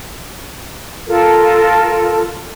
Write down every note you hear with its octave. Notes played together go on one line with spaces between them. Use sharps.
F4 A4 A#4